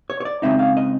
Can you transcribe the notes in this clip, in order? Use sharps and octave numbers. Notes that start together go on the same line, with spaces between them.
C#5
C#5
D5
C#3 E3 G#3 C4 D#4 E5
F5
D#5